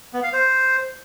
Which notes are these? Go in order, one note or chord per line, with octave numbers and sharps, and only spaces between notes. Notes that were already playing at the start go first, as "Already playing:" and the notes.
B3
F5
C5